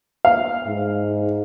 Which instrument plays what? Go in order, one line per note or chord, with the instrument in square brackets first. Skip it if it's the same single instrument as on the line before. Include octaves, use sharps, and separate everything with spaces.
[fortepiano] F5
[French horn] G#2